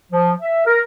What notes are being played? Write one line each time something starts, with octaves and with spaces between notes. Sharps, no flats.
F3
E5
A#4